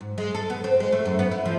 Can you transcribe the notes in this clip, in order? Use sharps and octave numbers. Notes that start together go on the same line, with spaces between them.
G#2
G#3
A4
B3
C4
G#3
A3
F#2
B3
E4
F3